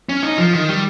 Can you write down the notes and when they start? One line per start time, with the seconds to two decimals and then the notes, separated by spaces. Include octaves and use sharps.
0.09 C#4
0.23 D#4
0.38 F3
0.53 D#3
0.69 G3